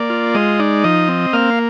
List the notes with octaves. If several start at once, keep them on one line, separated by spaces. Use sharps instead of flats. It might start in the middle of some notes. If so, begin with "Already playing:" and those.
Already playing: A#3 D5
F4
G#3 D#5
D#4 D5
F3 D#5
C4
A#3 F5